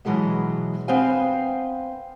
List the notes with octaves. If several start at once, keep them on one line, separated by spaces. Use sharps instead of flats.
B2 E3 F#3 G#3 B3
B3 C4 B4 C5 F5 G#5